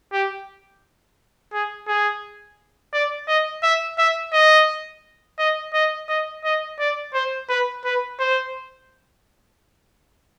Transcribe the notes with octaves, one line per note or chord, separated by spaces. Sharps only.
G4
G#4
G#4
D5
D#5
E5
E5
D#5
D#5
D#5
D#5
D#5
D5
C5
B4
B4
C5